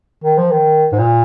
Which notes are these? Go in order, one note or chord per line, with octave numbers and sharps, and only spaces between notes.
D#3
F3
D#3
G#2
A#2